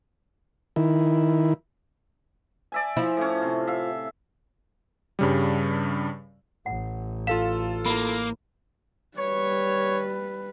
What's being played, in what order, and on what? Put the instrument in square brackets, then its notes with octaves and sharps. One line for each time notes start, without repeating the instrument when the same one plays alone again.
[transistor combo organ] D#3 E4
[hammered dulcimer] D5 E5 G#5
[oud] F3 E4
[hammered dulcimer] A2 C#4
C3 F5
E5 F5
[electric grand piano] G2 C#3 G3
[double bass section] A1 [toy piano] F#5
[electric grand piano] F4 A4 E7 [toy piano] F5
[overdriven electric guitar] A#3 [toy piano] E4 E5 B5
[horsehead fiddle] G3 B4 [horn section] C#5